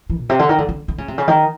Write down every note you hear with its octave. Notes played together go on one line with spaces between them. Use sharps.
E3
A#2
C3
D3
D#3
D3
D3
D3
C#3
C3
C#3
D#3